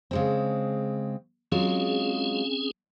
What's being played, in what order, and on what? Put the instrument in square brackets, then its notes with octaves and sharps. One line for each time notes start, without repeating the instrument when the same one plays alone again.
[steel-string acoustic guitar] C#3 G#3 C4
[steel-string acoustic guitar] F#3 G#3 F4 [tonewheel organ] C4 C#4 G#4